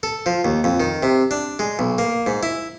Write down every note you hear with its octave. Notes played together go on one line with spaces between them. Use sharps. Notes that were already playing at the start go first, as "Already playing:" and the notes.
A4
F3
D#2
F2
D#3
C3
D4
G#3
B1
A#3
G#2
E4